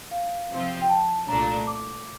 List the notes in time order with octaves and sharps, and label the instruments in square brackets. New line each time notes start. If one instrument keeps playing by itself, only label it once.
[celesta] F5
[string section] C3 F3 C4 F4
[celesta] G5
A5
[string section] C2 A#2 A3 D4 [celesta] A#5
[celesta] D6